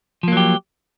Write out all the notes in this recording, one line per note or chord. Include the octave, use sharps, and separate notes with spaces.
F3 F#3 A#3 G4